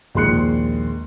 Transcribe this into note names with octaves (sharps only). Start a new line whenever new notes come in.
A#1 D#2 G#3 C6 F#6 C#7